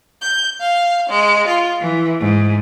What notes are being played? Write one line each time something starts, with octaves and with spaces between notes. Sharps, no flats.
G6
F5
G#3
F4
E3
G#2